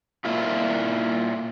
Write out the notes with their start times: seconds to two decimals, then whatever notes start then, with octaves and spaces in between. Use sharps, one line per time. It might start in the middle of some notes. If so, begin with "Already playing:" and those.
0.25 A#2 E4 F4